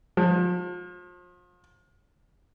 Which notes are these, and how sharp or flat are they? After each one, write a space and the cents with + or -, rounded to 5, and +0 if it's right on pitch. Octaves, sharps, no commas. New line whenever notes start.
F3 +35